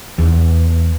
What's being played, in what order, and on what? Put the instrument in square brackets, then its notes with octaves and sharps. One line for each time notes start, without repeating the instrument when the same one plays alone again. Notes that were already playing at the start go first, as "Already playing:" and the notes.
[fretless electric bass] E2